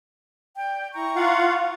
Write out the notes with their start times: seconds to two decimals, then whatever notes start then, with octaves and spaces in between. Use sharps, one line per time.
0.56 D5 G5
0.93 E4 A#5 C#6
1.16 F4 F5 F#5